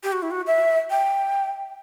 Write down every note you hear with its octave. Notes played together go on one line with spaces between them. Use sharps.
G4
F#4
E4
F#4
E5
G5